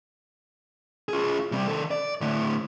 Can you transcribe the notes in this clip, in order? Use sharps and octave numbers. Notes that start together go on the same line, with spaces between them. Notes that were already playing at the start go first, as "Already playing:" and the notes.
F4 G#4
C3 G3
D#3 A4
D5
A2 D3